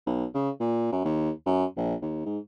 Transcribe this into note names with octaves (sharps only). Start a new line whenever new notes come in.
B1
C#3
A#2
F#2
D#2
F#2
A#1
D#2
G#2